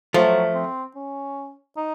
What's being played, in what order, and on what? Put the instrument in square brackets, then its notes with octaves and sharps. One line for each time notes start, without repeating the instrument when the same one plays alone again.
[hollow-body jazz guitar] F3 A3 [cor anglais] F#3
[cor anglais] C4
C#4
D#4